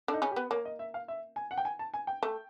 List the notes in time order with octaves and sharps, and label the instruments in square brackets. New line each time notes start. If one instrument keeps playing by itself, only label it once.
[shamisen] D3 D4
[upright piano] D#4
[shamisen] C#3 C#4
[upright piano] G4
[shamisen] B3
[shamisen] A#3 [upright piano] C#5
[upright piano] D#5
E5
F5
E5
G#5
F#5
G5
G#5
A5
G#5
G5
[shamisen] A3